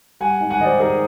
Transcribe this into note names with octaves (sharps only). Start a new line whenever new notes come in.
G3 F#5 G#5
G#2
F#5 G#5
D#3 C5 D5 D#5
G#2 G#4 A#4